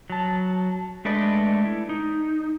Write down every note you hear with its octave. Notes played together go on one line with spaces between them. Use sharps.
F#3 A5
G#3 A3 D4 B4 D5 D#5
E4
D#4